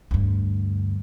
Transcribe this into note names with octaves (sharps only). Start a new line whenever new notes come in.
D2 G2